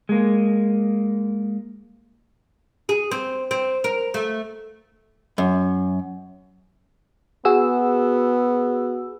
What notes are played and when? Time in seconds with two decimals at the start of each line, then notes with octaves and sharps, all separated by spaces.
0.09 G#3 A#3
2.89 G#4
3.11 C4
3.51 C4
3.84 A#4
4.14 A3
5.38 F#2
7.45 B3 F#4 G#4 E6